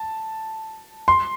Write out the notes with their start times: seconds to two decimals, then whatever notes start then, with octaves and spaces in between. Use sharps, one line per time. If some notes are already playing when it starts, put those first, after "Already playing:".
Already playing: A5
1.08 C6